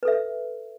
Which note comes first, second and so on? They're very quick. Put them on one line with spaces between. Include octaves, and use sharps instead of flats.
B4 A4 E5